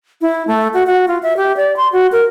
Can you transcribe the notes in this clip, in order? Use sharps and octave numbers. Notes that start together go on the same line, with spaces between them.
E4
A3
F#4
F#4
F4
E5
G4
D5
C6
F#4
A#4